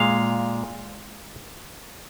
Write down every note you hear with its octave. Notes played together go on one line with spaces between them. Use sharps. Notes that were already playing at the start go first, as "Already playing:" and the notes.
Already playing: A#2 G#3 F5